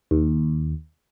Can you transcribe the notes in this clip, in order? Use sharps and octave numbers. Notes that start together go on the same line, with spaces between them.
D#2